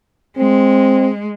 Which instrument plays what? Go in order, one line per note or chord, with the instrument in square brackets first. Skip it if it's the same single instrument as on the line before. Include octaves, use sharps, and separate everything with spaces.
[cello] G#3 [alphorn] C4